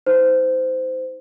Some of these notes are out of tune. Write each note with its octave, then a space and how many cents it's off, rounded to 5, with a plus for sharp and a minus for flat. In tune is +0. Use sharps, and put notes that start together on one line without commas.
D#4 +45 C5 -20